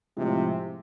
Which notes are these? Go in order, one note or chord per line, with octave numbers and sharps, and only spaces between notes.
A2 C3 F3 G#3